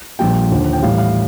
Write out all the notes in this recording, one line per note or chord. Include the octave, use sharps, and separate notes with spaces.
A#1 A#2 G3 G5
D#2 D3 F3
G5
A1 A2 G3 F5
F5